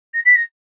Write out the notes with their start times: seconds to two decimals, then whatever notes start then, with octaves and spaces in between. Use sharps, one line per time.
0.14 A#6
0.25 B6
0.35 A#6